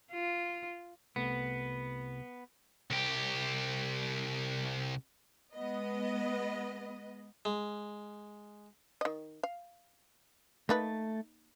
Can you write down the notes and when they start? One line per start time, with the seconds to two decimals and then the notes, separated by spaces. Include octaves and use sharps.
0.13 F4
1.16 C2 A3 B3
2.90 C2 G4
5.54 G#3 B3 B4 D#5
7.45 G#3
9.01 D#3 D#5
9.43 F5
10.69 A3 A#3 D#4 B4 A5